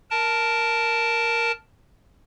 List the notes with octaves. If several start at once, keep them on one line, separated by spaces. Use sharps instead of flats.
A#4 A5